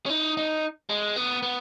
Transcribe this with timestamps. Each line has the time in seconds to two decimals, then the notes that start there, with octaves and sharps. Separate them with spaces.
0.06 C#4
0.10 D#4
0.37 D#4
0.90 G#3
1.16 B3
1.43 B3